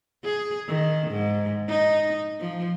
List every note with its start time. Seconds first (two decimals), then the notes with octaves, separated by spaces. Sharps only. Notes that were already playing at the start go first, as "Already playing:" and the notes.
0.24 G#4
0.68 D#3
1.11 G#2
1.68 D#4
2.40 F3